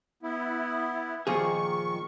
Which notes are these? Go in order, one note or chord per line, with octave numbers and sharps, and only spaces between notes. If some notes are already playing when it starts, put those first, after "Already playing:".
B3 E4
A#2 D#3 F3 G#4 C#6